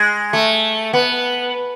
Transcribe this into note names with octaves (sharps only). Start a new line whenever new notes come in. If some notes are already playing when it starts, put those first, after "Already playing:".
Already playing: G#3
A3
B3